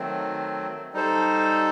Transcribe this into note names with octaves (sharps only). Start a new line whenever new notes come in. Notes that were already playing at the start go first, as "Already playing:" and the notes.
Already playing: D#3 F#3 A3 C4
G3 D#4 A4 C5